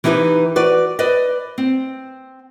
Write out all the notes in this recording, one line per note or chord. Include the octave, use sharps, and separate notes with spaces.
E3 D#4 E4 G4 B4
F#4 B4 D5
B4 D5 D#5
C4